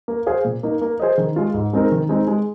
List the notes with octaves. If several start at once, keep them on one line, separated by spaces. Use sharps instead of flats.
A#3
G#4 C5 F5
A#2
A#3 D#4
A#3
G#4 C5 D#5
D#3
G#3 F4
G#2
G#3 C4 D#4 A#4
D#3
G#3 C4 D#4
G#3